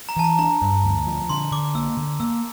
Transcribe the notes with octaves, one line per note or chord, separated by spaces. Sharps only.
A#5
E3 A5
A#5
D4 A#5
G2
D2
F3
D3 C6
D3 D6
A#3 E6
D3
A#3 E6